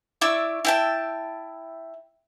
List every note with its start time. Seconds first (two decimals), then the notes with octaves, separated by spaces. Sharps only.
0.21 E4 D5 C#6 E6
0.65 E4 G5 A5